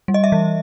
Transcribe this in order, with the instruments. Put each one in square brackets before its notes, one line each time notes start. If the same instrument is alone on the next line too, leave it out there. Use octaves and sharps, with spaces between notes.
[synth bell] G3
D#5
E5
E3